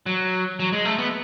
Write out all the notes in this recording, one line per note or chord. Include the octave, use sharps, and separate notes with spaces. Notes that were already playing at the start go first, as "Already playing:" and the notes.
F#3
F#3
G#3
A3
B3